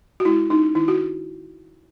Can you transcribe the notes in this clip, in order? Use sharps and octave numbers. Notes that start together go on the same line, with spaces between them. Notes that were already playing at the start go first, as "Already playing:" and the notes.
F#4
G#3 E4
C#4 D#4
D#3 E4
F#4